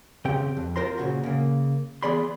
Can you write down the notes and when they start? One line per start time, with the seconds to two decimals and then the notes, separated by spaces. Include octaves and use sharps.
0.25 C#3 C4 G4 G5
0.57 F2
0.76 F4 A#4 C5 A#5 C6
0.98 A#2 C#3 F#4
1.23 C#3 A#3
2.03 E3 B3 G#4 D5 B5 C6